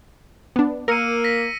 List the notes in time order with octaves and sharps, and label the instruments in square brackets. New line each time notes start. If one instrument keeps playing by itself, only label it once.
[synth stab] B3 D4
[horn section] A#3 [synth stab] A#4 [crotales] E6 C#7 D#7
[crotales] A#6 B6